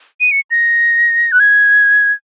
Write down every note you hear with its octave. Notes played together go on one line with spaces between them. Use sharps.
D#7
C#7
A#6
F#6
G#6